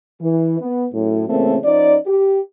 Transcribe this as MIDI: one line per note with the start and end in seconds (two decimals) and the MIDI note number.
0.21 0.59 52
0.60 0.85 59
0.93 1.24 42
0.93 1.24 45
1.29 1.58 46
1.29 1.58 49
1.29 1.58 52
1.29 1.58 57
1.29 1.58 58
1.29 1.58 60
1.65 1.96 53
1.65 1.96 61
1.65 1.96 63
1.65 1.96 74
2.07 2.40 67